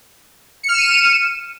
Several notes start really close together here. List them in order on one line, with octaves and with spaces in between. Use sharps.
C#7 F6 E7 D#7